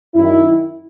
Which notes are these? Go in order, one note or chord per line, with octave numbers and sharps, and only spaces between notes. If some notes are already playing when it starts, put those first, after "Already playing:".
F#2 D#3 E4